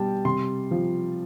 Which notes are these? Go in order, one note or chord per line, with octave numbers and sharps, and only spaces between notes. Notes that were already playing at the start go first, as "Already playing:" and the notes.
Already playing: B2 G3 G5 A5
C3 C6
F3